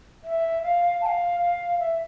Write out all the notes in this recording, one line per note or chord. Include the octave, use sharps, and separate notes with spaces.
E5
F5
A5
F5
F5
E5